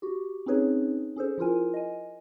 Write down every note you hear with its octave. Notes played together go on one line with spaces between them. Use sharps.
F#4 G4
C4 C#4 D#4 G#4 B4 C#5
C#4 G#4 A4 C5
F3 E4 F4 A#4 G#5
D#5 G#5